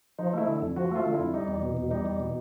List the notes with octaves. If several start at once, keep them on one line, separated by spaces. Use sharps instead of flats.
F3 D#4
A3 E4
D3
F2
F3 F#4
A3 F4
D3
E4
F2
G3 D#4
E2
B2
E2
G3 D#4
E2
B2